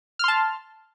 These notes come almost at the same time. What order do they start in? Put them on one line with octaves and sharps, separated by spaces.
F6 C6 A5